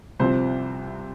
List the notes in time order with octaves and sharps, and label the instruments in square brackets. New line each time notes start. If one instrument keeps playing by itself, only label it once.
[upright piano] C2 C3 F3 C4 C5